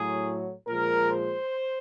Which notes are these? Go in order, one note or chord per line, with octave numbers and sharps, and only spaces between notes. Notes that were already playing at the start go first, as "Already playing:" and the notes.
Already playing: A2 F#3 G#4
A#2 F3 G#3 A#4
C5